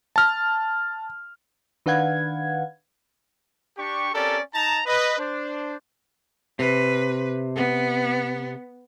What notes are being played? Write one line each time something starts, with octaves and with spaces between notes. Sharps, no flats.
A5 F6
D#3 D4 B4 F5 F#5 G#6
D4 G4 C#6
C4 C#4 G4 A4 A#4 D5
D#4 A5 A#5
B4 D#5
D4 C5
C3 B4
B3